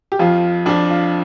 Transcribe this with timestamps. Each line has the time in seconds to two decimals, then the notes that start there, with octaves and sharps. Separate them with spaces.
0.12 G4
0.19 F2 F3 F4
0.66 F2 F3 D4
0.90 F4